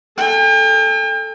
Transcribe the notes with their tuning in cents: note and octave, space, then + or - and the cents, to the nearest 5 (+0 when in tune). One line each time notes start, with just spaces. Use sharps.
A4 +0 G5 +40